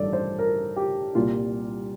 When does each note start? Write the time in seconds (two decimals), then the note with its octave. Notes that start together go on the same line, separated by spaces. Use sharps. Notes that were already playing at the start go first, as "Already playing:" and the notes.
Already playing: A1 G2 D#3 A4 D5
0.13 C5
0.39 A#4
0.76 G4
1.15 C2 A#2 G3 F4